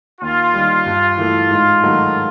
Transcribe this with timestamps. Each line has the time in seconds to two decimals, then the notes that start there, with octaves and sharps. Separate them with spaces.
0.21 D#2 F4
0.54 D#3 G3
0.86 G2
1.18 E3 A3
1.51 G#2
1.82 D#3 F#3 A3